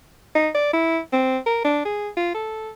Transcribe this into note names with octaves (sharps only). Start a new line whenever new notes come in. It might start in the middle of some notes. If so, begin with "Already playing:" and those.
D#4
D5
E4
C4
A#4
D4
G#4
F4
A4